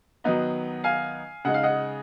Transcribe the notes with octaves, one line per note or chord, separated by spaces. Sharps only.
D#3 F#3 B3 D#4
F5 G#5
C#3 G#3 D#4 F#5
F5
D#5 F#5